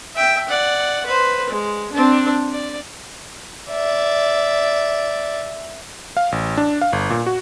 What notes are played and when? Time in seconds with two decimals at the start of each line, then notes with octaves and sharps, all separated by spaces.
0.15 E5 G5
0.49 D5 F#5
1.06 B4 C5
1.50 G#3
1.92 C4 D4
2.52 D5
3.71 D5 E5
6.17 F5
6.32 A1
6.58 D4
6.81 F5
6.93 G1
7.10 A#2
7.27 F#4